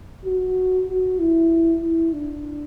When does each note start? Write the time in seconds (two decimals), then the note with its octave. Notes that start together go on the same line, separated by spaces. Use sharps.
0.25 F#4
0.88 F#4
1.19 E4
1.82 E4
2.13 D4